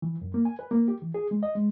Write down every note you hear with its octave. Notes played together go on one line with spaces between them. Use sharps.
E3
F#2
A#3
G#5
B4
A#3
G4
E3
G#4
G#3
D#5
G#3